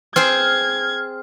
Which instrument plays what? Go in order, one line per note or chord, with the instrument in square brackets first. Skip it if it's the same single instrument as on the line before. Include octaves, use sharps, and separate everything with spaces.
[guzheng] C4 G#4 C5 [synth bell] F6 [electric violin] G#6